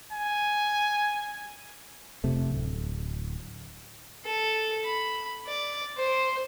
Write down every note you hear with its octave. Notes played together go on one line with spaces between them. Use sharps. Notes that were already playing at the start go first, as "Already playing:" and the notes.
G#5
F1 C3 A3
D1
A4
B5
D5
C5